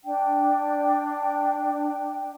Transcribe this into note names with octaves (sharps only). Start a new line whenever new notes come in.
D4 G5